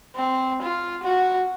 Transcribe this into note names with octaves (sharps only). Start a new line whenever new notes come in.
C4
F4
F#4